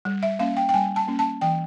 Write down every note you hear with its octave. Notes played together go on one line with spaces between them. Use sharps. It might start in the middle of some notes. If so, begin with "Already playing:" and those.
G3
E5
A#3 C#4 F5
G5
G5
G3 G#5
A5
A#3 C#4
A5
E3 G5